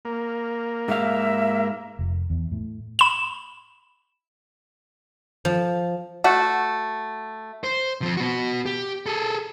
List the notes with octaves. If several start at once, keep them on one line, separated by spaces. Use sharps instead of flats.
A#3
G#2 E5 F5
F1
E2
A2
B5 E7
F3
A3 F#4
C5
F3 C4
B3 F#4
G4
G#4 A4